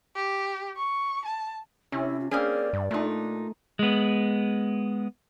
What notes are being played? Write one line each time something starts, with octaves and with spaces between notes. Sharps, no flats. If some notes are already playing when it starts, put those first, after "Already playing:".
G4
C#6
A5
C3 C#4 E4
F4
A#3 C4 C#4 G#4 D5
G2
A#2 A3 D#4
D4
G#3 B3